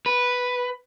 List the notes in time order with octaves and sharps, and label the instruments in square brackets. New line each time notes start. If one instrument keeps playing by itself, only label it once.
[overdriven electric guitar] B4